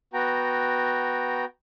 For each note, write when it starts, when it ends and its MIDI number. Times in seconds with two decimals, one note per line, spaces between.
0.13 1.45 59
0.13 1.45 66
0.13 1.45 79
0.13 1.45 82